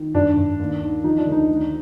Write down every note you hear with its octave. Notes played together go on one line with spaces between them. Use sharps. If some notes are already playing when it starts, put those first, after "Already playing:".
Already playing: D#3
G2 D4
G2
D#2
D#3
F3 D#4
D4
D2
D#4
D#3